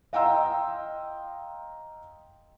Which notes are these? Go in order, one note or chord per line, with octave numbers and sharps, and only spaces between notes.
D#5 F5 G5 A#5 C6 E6